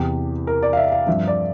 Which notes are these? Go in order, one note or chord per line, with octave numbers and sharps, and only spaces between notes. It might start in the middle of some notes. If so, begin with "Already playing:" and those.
Already playing: E2 C3 E3 G4
A#4
D5
F5
E5
F5
G2 F3 C4 E5
D5